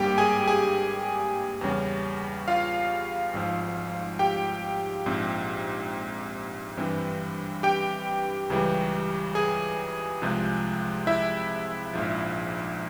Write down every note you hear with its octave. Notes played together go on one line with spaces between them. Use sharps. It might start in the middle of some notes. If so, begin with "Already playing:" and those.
Already playing: G#1 G2 G3 A#3 G4 G5
G#4 G#5
G#4 G#5
E2 C#3 G3 C#4
F4 F5
G#1 G#2 F3
G4 G5
A#1 G#2 F3 C4
G2 E3 G3 C4
G4 G5
C#2 C#3 E3 G3
G#4 G#5
C2 C3 F3 G#3 C4
E4 E5
A#1 G#2 F3